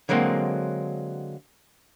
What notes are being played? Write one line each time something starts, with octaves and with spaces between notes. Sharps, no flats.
D3 F#3 G#3 A#3 C4